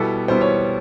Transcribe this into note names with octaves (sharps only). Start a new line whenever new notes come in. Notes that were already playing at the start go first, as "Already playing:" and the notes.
Already playing: B2 G3 B3 E4 A4
B2 G3 B3 E4 C5
C#5